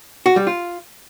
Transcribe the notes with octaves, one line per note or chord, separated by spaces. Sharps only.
F#4
G3
F4